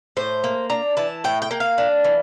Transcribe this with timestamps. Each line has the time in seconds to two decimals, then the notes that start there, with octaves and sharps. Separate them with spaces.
0.17 A2 C5
0.44 A#3
0.70 D4 A#5
0.97 E3 A5
1.24 A2 G5
1.42 G5
1.51 A#3
1.60 F5
1.78 D4
2.04 E3